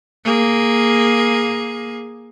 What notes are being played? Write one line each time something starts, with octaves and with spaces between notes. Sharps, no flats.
A#3 G#4